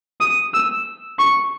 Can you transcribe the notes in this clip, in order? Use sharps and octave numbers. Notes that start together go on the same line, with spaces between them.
D#6
E6
C#6